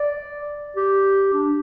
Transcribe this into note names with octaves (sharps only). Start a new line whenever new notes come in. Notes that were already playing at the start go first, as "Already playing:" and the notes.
Already playing: D5
G4
D4